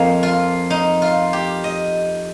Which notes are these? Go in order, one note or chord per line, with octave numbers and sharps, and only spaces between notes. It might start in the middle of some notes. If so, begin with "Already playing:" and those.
Already playing: F2 F3 A#3 D#5 F5
F4
D#4
F4
G4
D#5